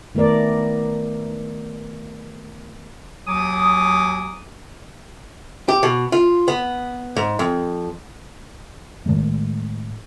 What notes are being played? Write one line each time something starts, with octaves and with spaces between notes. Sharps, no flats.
D#3 A3 B3 A#4 D5
D#2 F#3 G#5 D6 D#6
G4
B2
F4
B3
G#2
F2
A2 D#3 G#3 A3